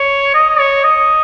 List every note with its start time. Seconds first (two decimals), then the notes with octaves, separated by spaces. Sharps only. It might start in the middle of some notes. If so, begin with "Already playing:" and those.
Already playing: C#5
0.34 D#5
0.59 C#5
0.84 D#5